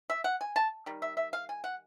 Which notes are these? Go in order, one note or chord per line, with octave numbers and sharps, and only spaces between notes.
E5
F#5
G#5
A5
D#3 G3
E5
E5
F5
G#5
F#5